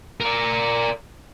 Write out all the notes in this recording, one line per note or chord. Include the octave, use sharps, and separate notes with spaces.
A#4 D5